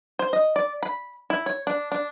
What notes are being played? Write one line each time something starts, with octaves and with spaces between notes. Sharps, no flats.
C5
D#5
D5
B5
E4
C#5
D4
D4